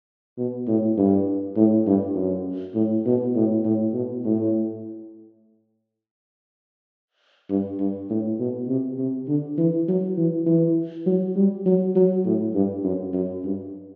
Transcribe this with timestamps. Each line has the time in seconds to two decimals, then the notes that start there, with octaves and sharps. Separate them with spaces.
0.38 B2
0.68 A2
0.97 G2
1.56 A2
1.87 G2
2.15 F#2
2.75 A2
3.05 B2
3.35 A2
3.65 A2
3.93 B2
4.24 A2
7.50 G2
7.80 G2
8.10 A2
8.40 B2
8.68 C3
8.98 C3
9.28 D3
9.58 E3
9.88 F#3
10.17 E3
10.46 E3
11.06 F#3
11.36 G3
11.66 F#3
11.96 F#3
12.25 A2
12.55 G2
12.84 F#2
13.13 F#2
13.44 G2